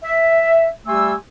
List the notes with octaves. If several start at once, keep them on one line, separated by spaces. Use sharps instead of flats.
E5
G3 A3 G4 G#5 C6 E6